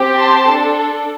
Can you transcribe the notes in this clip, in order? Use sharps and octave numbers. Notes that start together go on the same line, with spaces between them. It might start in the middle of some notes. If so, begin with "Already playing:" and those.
Already playing: C4 G4
A5 C6
D4 A4